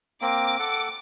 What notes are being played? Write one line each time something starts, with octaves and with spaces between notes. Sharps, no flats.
A#3 C4 D6
A4 F#5